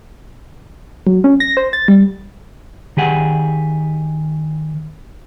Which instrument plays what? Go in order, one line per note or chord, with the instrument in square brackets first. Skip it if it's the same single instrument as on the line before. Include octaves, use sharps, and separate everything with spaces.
[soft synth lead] F#3
C#4
A#6
C5
A6
G3
[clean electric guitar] D#3 G4 G#4 F#5